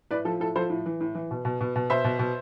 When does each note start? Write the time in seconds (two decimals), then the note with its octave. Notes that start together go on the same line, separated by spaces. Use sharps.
0.11 A2 B4 D5
0.25 F3 A4
0.40 A2 A4
0.56 F3 A4 C5
0.70 A2
0.86 E3
1.01 A2
1.15 E3
1.31 B2
1.45 B2
1.61 B2
1.76 B2
1.90 B2 C5 E5
2.04 B2
2.19 B2